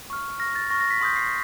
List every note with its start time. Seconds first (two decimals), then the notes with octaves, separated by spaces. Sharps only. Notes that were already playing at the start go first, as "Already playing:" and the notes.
0.10 C#6 F6
0.40 C#6 F6 A#6
0.55 A6
0.70 C#6 F6 A#6
0.81 A#6
0.91 B6
1.01 C6 D#6 G6 B6
1.16 C7